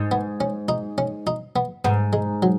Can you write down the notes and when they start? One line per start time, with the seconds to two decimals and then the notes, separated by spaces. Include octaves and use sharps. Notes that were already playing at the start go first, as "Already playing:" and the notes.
Already playing: G#2
0.11 B3
0.41 C#4
0.68 D#4
0.98 C#4
1.27 D#4
1.56 B3
1.85 G#2 B3
2.13 G#3
2.42 F#3